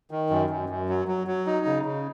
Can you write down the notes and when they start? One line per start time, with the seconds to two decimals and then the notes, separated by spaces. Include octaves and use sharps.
0.11 D#3
0.30 F#2
0.50 F#2
0.69 F#2
0.89 F#3
1.08 F#3
1.27 F#3
1.46 D#4
1.66 C#3
1.85 C#3